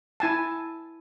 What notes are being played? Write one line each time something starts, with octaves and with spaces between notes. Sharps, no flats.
E4 G#5 A5